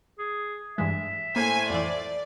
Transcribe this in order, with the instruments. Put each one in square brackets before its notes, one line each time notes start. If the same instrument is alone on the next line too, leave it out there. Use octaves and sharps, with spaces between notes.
[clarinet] G#4
[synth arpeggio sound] G2 E3 G#3 [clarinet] E5
[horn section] A2 C5 [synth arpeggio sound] A#3 [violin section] G#5
[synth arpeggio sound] F2 E3 [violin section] D5